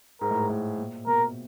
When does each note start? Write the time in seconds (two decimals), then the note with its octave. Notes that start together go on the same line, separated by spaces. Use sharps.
0.21 G#2 A#4
0.31 A2
0.40 G#2
0.49 A2
0.78 A#2
1.07 B2 A#4